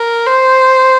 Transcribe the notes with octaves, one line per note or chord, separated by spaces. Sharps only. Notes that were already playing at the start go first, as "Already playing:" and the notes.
Already playing: A#4
C5